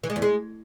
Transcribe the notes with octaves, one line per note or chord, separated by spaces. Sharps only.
E3
G#3
E2
G#3